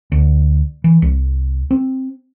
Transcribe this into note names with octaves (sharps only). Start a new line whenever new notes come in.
D2
E3
C2
C4